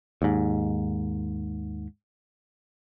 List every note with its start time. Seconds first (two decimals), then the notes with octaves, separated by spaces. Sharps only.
0.22 D#2 G#2